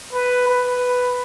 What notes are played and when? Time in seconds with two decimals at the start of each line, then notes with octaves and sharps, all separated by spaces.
0.13 B4
0.48 B4